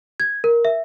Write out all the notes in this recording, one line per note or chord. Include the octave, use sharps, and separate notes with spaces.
G#6
A#4
E5